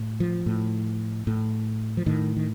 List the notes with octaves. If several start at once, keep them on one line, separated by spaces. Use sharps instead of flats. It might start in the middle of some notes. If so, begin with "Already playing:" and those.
Already playing: A2
F3
A2
A2
F3
A2 D#3
D#3